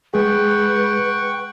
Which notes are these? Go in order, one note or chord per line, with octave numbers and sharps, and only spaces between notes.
G#3 G#4 B4 F#5 G5 C#6